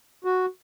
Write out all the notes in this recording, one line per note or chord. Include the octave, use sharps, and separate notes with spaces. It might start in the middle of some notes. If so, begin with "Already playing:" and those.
F#4